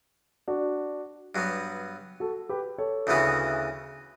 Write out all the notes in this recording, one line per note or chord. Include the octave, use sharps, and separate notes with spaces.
D4 F#4
G2 F#3 B3
F#4 A4
G4 B4
A4 C#5
D2 C#3 E3 B3 F#4